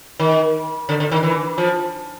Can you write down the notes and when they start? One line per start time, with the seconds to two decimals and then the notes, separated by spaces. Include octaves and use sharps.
0.19 D#3
0.89 D3
1.00 D3
1.11 D#3
1.23 E3
1.58 F3